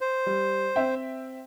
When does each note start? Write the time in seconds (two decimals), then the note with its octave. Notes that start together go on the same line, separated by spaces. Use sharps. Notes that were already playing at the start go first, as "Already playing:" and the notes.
0.01 C5
0.26 G3
0.76 C4 E5 G5